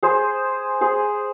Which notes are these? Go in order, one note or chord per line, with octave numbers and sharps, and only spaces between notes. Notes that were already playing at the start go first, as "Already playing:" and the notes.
G#4 C5
G#4 C5